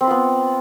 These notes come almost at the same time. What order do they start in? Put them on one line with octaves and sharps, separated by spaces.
C4 B4 F4 B3